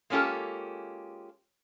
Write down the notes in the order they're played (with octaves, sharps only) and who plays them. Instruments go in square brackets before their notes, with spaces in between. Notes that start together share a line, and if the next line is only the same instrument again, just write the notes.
[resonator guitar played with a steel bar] G#3 A#3 C#4 F4 G4 A4